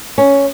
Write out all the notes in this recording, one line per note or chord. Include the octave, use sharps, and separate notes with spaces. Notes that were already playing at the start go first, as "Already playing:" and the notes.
C#4